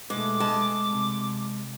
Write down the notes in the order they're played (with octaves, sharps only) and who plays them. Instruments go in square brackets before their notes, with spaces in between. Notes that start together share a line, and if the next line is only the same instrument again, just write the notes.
[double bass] B2 A3 [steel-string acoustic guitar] G#3 [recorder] D6
[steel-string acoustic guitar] G#3 G#5 A5
[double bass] C3